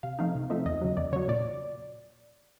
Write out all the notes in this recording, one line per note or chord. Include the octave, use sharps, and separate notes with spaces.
C3 F5
F3 A3 C4 D#4 F5
C3
F3 A3 C4 D#4 E5
E2 D#5
C#3 F#3
E2 D5
C#3 F#3 C#5
A#2 D5